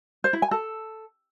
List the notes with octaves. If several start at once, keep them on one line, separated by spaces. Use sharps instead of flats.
C5
E4
G#5
A4